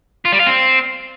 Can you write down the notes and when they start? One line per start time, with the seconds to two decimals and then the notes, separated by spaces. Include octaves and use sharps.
0.25 F4
0.32 G3
0.39 F4
0.46 C4